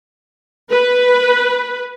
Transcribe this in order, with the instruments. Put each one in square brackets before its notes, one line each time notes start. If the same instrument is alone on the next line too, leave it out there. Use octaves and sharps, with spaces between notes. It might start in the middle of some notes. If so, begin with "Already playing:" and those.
[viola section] B4